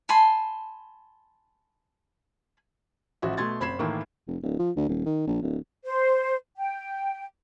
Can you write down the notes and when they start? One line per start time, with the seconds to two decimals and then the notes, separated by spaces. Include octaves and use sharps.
0.09 G#5 A5 B5 C6
3.22 A1 F3 F#4 E5
3.37 B2 A3 C6 G#6 A6
3.60 F#1 C4 B5 G#6 C7 E7
3.79 A2 D#3 E3 A#3 E4
4.27 F1
4.43 D1
4.59 F3
4.76 D2
4.89 D#1
5.06 D#3
5.27 A#1
5.42 D1
5.85 C5
6.58 G5